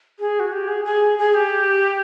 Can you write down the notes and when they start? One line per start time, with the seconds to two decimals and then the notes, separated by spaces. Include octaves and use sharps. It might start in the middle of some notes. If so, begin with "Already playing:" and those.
0.19 G#4
0.40 F#4
0.52 G4
0.68 G#4
0.85 G#4
1.18 G#4
1.35 G4